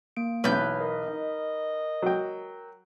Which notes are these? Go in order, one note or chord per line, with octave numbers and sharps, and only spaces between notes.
A#3 D7
B1 E2 B4 C#5 F6 G6
A#4 D#5
D#4
F#3 G5